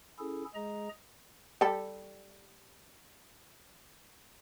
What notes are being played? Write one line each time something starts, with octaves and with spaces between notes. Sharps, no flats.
C#4 E4 G#4 A4
G#3 G#4 D#5 A#5
G3 G4 A4